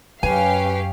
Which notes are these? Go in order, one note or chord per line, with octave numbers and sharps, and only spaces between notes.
F#2 C#4 G4 B4 F5 G#5